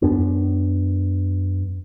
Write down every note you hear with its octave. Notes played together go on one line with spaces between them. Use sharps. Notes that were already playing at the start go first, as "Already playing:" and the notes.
F#2 B3 D4